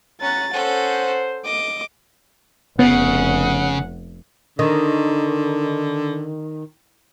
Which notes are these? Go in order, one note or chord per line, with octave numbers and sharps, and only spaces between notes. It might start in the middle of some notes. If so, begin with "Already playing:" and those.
C#4 C#5 F#5 A#5 A6
C#4 A4 C5 F#5
D#5 D6
F1 C#3 B3 F#5
D3 D#3